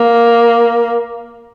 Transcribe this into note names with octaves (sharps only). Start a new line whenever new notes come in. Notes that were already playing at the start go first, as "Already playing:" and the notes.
Already playing: A#3